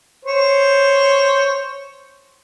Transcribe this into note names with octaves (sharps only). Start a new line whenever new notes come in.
C5 C#5